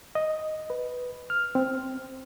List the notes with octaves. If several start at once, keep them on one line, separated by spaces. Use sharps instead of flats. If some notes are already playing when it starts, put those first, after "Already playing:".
D#5
B4
F6
C4